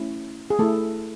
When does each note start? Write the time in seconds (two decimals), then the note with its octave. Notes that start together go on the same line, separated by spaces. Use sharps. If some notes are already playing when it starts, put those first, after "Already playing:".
Already playing: A3 C#4 E4
0.50 G#4
0.59 A3 E4 A4